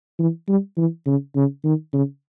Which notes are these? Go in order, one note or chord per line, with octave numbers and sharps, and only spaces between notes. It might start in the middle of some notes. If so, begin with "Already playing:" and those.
E3
G3
E3
C#3
C#3
D#3
C#3